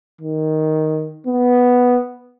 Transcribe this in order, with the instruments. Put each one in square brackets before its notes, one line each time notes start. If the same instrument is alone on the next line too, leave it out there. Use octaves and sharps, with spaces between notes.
[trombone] D#3
B3